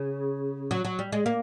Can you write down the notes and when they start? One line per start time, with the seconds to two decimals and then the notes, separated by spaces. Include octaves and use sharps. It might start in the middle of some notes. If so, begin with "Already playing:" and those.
Already playing: C#3
0.71 F#3
0.85 F#3
0.99 G3
1.12 G#3
1.26 A#3